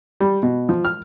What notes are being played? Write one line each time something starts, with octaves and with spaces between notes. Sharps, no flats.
G3
B2
F3
F6